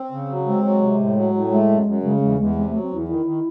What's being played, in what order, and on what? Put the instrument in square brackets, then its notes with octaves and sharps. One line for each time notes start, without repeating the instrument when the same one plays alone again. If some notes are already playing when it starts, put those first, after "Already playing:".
Already playing: [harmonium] C4
C#3
F#3
[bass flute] G#3 [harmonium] C4
[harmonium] F#3
C3
A2
F#3
A2
[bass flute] G#3 [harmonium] A3
[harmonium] F#2
F#2
[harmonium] C#3 [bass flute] G#3
[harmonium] E2 [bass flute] G#3
[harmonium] E2 [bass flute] G#3
[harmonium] C3 [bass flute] G#3
[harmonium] F#3 [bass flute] A3
[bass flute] C4
[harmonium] E2 [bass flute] E4
[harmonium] D#3 [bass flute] E4
[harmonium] D#3